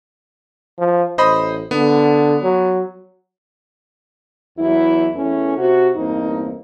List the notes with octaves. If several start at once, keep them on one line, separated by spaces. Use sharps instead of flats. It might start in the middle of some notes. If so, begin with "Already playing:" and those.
F3
A1 C5 D#5 B5
D3 B3
F#3
E2 F#3 E4
E2 E3 A3 C#4
C3 F#4
E2 G2 A#3 C4 D#4